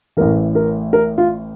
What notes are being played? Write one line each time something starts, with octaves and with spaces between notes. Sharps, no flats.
A1 A2 E3 A#4
A#4
A#4
F4